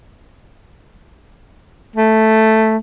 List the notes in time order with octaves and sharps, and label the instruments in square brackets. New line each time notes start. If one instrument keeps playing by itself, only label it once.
[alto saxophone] A3